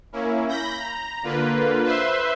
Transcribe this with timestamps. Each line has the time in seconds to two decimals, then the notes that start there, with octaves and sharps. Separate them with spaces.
0.12 A#3 C#4 E4
0.48 B5 G6 A#6
0.79 A#5
1.23 D3 A#3 F4 B4
1.84 B4 C5 E5 C6